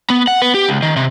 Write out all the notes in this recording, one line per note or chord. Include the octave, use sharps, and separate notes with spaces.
B3
F#5
B3
G4
C#2
D#3
C3